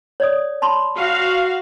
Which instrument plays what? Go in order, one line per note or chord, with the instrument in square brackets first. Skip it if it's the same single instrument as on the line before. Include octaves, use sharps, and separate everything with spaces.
[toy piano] C#5 D5 D#6
A5 B5 C6
[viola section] F#4 F5